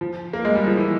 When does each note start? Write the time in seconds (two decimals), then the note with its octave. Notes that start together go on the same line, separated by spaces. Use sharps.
0.01 F3
0.33 A#3
0.45 G#3
0.55 G3
0.67 F3
0.77 E3